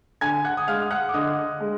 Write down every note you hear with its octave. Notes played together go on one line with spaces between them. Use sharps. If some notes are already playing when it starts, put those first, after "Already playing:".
D3 G#5 G#6
F#5 F#6
D#6
G#3 F5 F6
F#5 F#6
D6
D3 D#5 D#6
G#3